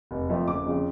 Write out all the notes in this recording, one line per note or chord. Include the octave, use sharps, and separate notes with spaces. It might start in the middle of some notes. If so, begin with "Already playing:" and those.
F1
F2 F3 A3
F#1 D6
F2 C#3